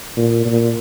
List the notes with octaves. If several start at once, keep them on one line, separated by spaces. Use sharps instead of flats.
A#2
A#2